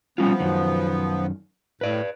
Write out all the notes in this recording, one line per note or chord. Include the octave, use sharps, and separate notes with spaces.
F3 G3 B3 C#4 F4
F#2 D#3
A2 B4 D5